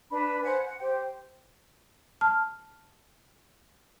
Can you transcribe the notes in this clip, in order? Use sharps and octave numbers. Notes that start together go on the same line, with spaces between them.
D4 B4 B5
C5 F#5 G#5 F#6
F#5
G4 C5 G5
A5 F6